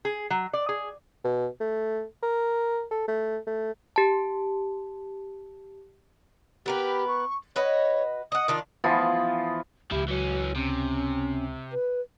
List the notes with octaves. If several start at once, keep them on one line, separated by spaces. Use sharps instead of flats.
G#4
F#3
D5
G#4
B2
A3
A#4
A4
A3
A3
G4 A5
B3 G4 A#4 B4
C#6
F#4 B4 C#5 D#5
D#5 F#5 D#6
D#3 D4 F4
E3 F3 B3 F4
C#2 F3 E4 G4
E3 F#3 C#4
C3 C#4
B4